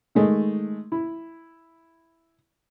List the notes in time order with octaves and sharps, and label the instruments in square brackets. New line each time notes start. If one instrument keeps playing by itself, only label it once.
[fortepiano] D#3 G#3 A3
E4